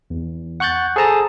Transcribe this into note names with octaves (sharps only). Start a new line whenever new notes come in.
E2
F#5 C#6 F#6 G6 A6
G#4 A4 C5 A5 A#5 D#6